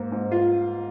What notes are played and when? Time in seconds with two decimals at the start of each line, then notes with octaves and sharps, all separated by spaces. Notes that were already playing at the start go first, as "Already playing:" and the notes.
Already playing: G#2 A#3
0.12 G#2
0.32 F4